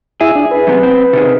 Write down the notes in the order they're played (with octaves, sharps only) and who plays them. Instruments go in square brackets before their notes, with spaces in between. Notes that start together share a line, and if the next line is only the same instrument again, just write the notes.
[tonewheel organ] E4 E5 [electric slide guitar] G#4
[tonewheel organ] D4
B4
[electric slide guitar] F#2 C3 B3
C4
C3 D#3 G#4